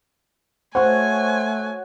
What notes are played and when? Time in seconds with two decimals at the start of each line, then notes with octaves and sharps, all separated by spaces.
0.75 A3 F#4 C5 C#5 F#5 G#5